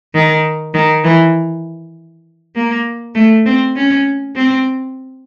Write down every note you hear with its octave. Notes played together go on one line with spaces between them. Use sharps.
D#3
D#3
E3
A#3
A3
C4
C#4
C4